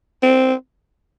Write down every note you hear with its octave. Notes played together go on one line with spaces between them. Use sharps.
C4